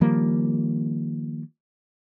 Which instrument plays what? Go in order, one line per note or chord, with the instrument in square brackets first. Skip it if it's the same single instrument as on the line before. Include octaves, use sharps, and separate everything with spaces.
[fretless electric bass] D#3 F3 G3 A#3